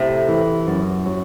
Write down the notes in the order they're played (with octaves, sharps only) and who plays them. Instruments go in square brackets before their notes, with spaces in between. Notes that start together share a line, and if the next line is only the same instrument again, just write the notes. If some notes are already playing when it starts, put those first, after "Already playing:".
Already playing: [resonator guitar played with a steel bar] A2 [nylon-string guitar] C3
[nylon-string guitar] E3
F#2
F#3